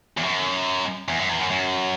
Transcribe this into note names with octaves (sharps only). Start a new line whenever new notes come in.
E2
F#2
E2
F#2
E2
F#2
F#2